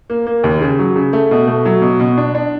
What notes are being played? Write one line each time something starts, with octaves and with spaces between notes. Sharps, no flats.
A#3
A#3
D#2
C#3
F#3
C#3
A3
B2
A3
F#3
B2
B2
D4
D4